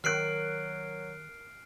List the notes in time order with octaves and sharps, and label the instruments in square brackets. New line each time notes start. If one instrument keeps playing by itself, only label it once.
[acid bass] D#3 [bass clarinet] F#3 [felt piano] A#4 F#6 [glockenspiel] F6 C7 D7